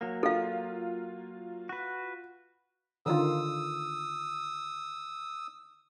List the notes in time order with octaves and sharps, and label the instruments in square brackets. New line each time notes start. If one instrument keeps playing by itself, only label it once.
[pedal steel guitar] F#3 A#3
[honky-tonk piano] F4 [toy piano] A4 F5
[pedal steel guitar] F#4 B4
[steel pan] D3 D#3 F4 [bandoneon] D#6 E6